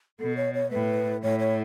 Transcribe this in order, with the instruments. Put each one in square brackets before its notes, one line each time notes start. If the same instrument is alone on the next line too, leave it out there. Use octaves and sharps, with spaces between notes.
[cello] B2 [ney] A4
[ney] C#5
C#5
[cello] A2 [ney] B4
[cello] A2 [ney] C#5
[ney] C#5